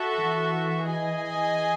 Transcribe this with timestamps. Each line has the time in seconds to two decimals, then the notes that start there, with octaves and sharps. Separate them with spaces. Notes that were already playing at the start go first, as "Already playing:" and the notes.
Already playing: F#4 A4 E5
0.15 E3
0.86 G#4 D#5 G#5